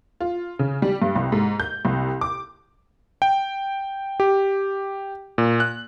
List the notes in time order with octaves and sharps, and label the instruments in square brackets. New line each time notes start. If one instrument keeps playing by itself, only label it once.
[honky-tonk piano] F4
C#3
G3
G2
C2
G#2
G6
C2
D6
[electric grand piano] G5
G4
A#2
F#6